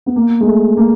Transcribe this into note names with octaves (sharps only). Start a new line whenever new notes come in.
B3
A#3
G#3
A3
A#3